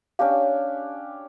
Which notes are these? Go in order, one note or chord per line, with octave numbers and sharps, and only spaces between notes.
C#4 D4 G4 F5